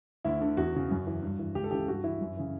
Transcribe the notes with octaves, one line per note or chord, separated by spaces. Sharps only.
D2 E4
D3
E2 F#4
C#3 E3
F#2
E3
G2
E3
C#2 G4
A4
C#3 E3 G4
G2 F#4
E3 E4
F#2
C#3 E3